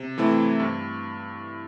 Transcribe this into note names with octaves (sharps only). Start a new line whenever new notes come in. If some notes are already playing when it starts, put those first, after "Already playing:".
Already playing: C3
E3 A3 C4 E4
G2